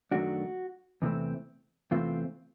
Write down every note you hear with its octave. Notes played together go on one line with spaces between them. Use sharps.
F#2 D#3 F#3 A3 D4 F#4
E2 C3 E3 A3 C4
E2 C3 E3 A3 C4 F4